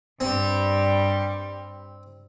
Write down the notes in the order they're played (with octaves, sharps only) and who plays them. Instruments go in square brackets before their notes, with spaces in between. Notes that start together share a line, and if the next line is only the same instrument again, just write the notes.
[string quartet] G2 G3 [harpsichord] C4